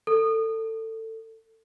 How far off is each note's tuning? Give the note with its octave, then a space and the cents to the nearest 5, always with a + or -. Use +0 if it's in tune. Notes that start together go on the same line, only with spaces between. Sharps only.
A4 +20